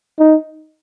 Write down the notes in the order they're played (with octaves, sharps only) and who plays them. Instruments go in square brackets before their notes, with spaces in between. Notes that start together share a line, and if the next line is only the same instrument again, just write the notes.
[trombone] D#4